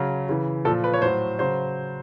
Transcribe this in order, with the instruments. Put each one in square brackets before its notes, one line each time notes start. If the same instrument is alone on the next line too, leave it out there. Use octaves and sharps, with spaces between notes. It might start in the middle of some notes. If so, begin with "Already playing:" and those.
Already playing: [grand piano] C#3 F#3
C#3 E3
A#2 A4
F3
B4
C#5
A2 F#3 C5
C#3 F#3 C5